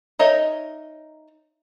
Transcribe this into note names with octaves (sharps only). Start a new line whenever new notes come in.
D#4 A#4 C#5 D#5 E5